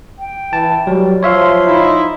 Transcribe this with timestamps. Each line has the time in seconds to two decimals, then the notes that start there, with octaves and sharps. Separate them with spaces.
0.19 G5
0.53 E3 A5
0.87 F#3 G3
1.23 F3 C#5 E5 F5 C6
1.67 D#4 E4